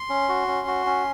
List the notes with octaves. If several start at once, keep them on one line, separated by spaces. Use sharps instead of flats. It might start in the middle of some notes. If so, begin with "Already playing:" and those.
Already playing: C6
C#4
F#4
C#4
F#4
C#4